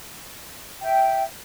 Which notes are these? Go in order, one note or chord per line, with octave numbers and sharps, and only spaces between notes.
E5 G5